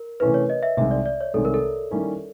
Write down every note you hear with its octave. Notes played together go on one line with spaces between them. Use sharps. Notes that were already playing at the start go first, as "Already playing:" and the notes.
Already playing: A#4
C3 E3 A3 C#4 E4 B4
C#5
D#5
E5
C2 C3 D#3 G#3 E5
D5
D5
C#5
C2 C3 D#3 G#3 A4
A#4
A4
D#3 G3 A#3 C#4 E4